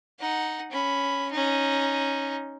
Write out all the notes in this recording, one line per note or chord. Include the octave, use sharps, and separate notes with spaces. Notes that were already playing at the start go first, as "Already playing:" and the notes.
D#4 F#5
C#4 B5
C#4 D#4